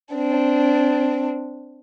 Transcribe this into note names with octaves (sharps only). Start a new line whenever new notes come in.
C4 D4